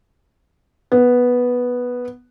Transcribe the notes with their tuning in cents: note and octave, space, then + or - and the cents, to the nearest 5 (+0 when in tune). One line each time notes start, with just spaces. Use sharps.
B3 -5